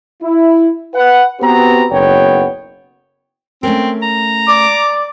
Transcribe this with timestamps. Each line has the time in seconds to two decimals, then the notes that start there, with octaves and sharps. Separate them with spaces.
0.22 E4
0.94 B4 F#5
1.40 B3 C4 F#4 G4 B4 A#5
1.91 F#1 B1 B3 C#5 F#5 G5
3.63 A3 C4 C#4 A#4
4.03 A#5
4.49 D5 D6